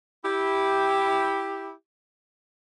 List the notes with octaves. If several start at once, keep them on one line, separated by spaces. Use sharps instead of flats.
E4 G4